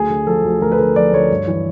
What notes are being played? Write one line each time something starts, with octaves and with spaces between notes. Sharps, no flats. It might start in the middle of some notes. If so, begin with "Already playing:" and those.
Already playing: D2 G#4
D3
F3 A4
D2
D2 A#4
B4
D3 A#4
F3 D5
D2 C#5
G2
E3